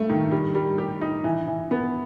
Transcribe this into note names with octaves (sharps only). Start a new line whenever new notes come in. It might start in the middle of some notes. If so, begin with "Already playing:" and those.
Already playing: G2 A3
D#3
G3
G3
G4
D#4
E3
E3
B3